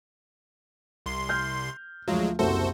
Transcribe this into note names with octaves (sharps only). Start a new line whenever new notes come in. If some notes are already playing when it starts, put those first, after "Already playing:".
C2 C6
F6 G6
D2 F3 F#3 G#3
F#1 C2 F#4 A4 C5